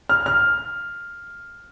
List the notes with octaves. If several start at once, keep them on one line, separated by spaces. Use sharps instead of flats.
F6
F6